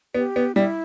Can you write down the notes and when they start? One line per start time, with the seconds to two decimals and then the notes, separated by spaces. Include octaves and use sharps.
0.14 B3 G4
0.36 B3
0.56 G3 E4